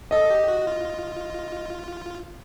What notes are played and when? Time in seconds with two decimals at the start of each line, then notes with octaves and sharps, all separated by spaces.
0.11 A4 D#5
0.30 G4
0.48 F#4
0.67 F4